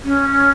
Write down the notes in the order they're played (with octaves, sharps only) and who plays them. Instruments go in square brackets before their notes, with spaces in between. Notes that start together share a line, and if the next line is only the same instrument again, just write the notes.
[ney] C#4